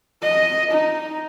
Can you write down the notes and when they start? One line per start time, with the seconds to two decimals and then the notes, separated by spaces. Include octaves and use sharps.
0.22 D#5
0.71 D#4